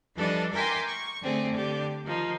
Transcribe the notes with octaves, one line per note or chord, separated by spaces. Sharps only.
E3 F3 G3 D4 A4 D#5
A#4 E5 G5 G#5 C6 D6
C#6
D3 A3 C4 G#4
D3 G4
D#3 F3 D#4